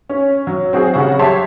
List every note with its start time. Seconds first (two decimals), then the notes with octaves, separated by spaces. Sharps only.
0.09 C#4
0.47 F#3
0.73 C4 F#4 G#4
0.94 C#3 F#3 G3 F#4 F#5
1.19 G4 C#5 E5 A5 C6